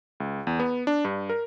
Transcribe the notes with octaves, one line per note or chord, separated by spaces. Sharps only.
C#2
E2
B3
D4
G2
A#4